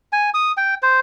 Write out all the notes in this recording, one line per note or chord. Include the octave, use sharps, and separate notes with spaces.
G#5
D#6
G5
C5